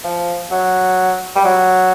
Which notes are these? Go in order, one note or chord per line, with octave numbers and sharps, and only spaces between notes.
F3
F#3
G3
F#3